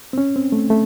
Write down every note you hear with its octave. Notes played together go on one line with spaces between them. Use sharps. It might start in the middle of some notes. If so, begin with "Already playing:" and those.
C4
C#4
C4
A3
A3